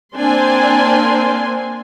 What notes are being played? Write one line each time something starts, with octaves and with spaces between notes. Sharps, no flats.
A#3 C4 D4 G#5 C6